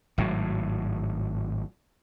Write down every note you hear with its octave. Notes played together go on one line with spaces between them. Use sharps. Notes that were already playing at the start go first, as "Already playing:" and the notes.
G#1 A2 F#3